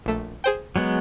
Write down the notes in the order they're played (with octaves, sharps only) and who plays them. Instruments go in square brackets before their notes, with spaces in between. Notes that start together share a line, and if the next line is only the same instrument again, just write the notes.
[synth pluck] A#1 A3
G#4 C5 G5
[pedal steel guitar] F#3 G#3 B3